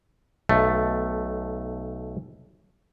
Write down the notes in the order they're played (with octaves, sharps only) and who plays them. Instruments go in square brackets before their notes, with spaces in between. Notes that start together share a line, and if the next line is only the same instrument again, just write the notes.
[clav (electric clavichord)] B1 A3